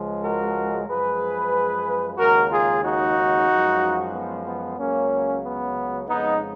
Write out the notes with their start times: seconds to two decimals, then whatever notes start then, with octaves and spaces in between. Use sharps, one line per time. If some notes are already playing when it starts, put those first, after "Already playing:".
Already playing: C#2 C#3 F3 G#3
0.23 F#4 A#4
0.88 F#2 F3 G#3 G#4 B4
2.18 D#2 C#3 G#3 F#4 A#4
2.51 F4 G#4
2.83 D#4 F#4
3.48 F#2 F3 G#3
4.13 B3
4.46 B3
4.78 C#2 C#3 F#3 A#3 C#4
5.43 B3
6.08 F2 C#3 G#3 B3 D#4